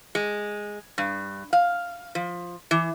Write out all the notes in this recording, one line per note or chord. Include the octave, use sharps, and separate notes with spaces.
G#3
G2
F5
F3
E3